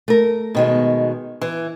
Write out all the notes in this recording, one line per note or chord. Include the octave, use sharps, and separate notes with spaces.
A3 A#4
B2 D#3 G#3
E3